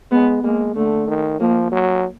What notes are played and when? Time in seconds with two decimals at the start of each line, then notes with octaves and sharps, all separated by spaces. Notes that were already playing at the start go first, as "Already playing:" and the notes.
0.12 G#3 B3
0.43 G#3 A#3
0.76 D3 A3
1.08 D#3
1.40 F3 A#3
1.72 F#3